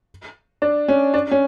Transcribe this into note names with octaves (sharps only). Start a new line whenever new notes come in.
D4
C#4
D4
C#4